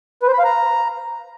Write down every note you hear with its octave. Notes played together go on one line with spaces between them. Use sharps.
B4
C5
B5
F5
A#5